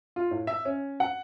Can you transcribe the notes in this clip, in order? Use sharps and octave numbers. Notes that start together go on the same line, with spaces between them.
F4
A2
E5
C#4
F#5